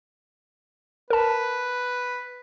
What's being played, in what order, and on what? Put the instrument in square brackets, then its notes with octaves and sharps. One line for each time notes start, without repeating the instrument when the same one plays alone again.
[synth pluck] A#4 A5 [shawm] B4